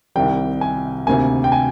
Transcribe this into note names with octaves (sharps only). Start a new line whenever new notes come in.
C2 C3 D#3 G3 G5
G#5
D2 C3 D#3 A#3 G#5
G5
G#5